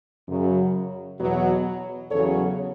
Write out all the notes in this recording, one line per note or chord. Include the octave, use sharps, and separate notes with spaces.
F#2 C#3 F#3
E2 B2 F#3
E2 C#3 F#3 A4 C#5